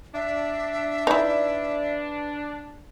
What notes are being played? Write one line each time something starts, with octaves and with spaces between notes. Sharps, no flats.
D4 E5
D#4 E4 B4 D5